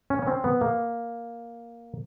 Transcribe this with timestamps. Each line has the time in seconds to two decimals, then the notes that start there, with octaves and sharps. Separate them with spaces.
0.10 C#4
0.22 C#4
0.27 C4
0.44 B3
0.61 A#3